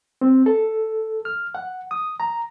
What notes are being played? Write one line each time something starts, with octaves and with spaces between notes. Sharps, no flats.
C4
A4
F6
F#5
D#6
A#5